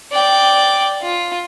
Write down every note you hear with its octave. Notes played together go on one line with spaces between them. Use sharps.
D5 G5
F4